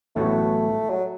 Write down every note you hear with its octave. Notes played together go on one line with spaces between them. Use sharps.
A1 A2 F#3 A3 B3 F#4
F#3